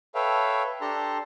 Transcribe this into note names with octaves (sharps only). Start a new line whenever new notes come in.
A4 B4 C#5 E5 F5 G5
D4 G4 A4 A5 A#5 C6